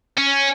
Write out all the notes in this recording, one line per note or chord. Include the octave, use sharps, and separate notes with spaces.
C#4